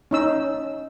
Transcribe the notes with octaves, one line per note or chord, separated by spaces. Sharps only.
C#4 D#4 E6